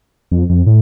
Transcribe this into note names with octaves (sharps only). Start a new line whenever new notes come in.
F2
F2
A2